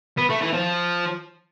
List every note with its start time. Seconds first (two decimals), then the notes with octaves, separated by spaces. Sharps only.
0.18 B3
0.30 A3
0.41 E3
0.53 F3